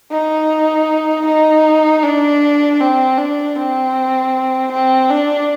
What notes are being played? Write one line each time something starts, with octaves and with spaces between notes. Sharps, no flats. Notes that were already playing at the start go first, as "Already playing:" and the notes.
D#4
D#4
D4
C4
D4
C4
C4
D4